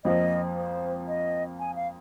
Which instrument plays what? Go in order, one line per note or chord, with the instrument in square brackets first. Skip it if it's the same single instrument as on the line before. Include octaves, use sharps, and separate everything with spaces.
[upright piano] F2 F3 A#3 [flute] D#5
[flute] C5
D#5
G#5
F5